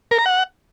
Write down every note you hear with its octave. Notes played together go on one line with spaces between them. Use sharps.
A#4
A#5
F#5